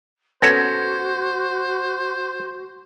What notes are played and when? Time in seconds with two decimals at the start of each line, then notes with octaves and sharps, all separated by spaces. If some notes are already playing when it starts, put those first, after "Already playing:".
0.42 B3 C#4 F#4 A4 C5 G#6 A#6